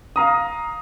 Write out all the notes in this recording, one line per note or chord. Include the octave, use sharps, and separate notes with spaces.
F5 A#5 D#6